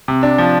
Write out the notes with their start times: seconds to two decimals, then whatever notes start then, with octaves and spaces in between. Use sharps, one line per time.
0.08 C3
0.23 D4
0.38 F3